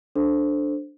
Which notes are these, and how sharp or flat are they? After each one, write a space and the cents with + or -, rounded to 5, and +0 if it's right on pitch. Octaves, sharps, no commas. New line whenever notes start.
D4 +0 A4 +0 C5 +0